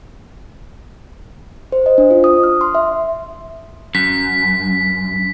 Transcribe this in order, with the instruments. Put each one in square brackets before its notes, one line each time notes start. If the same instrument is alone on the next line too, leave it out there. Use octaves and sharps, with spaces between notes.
[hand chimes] C5
D#5
D4
F4
D#6
F6
C6
E5
[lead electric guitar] F#2 [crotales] B6